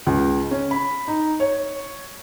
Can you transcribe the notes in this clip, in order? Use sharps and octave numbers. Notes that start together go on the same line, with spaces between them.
C#2
C#4
B5
D#4
C#5